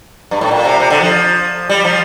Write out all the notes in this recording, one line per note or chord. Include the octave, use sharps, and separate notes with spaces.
G2
A2
A#2
C3
C3
D3
F3
G3
F3